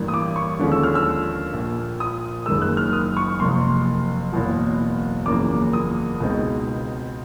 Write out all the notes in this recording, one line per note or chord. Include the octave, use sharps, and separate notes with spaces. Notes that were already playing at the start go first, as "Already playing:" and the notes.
Already playing: A1 G2 E3 G3 A#3
D#6
D6
C#6
D#2 D3 F3 G#3 C#4
E6
F6
E6
A#1 A#2 F3
D#6
F#1 F#2 D#3 G#3 E6
F#6
F6
D#6
C#6
F#1 F2 C3 C6
F#1 E2 B2 F#3
F#1 E2 C#3 F3 A#3 D6
D#6
C#2 B2 G#3 C4 D#4